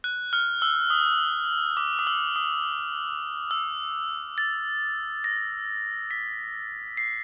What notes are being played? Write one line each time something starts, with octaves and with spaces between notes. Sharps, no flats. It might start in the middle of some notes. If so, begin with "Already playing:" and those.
F#6
F6
E6
D#6
D6
D#6
E6
D#6
E6
A6
A#6
B6
C7